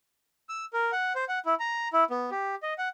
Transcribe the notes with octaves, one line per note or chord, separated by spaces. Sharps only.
E6
A#4
F#5
C5
F#5
E4
A#5
E4
B3
G4
D#5
F#5